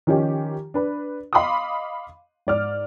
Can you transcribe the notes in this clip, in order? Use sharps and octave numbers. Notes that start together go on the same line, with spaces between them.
D#3 F3 C#4 D#4 G4
D4 B4
D#5 F5 B5 C6 D6 D#6
G#2 D5 F6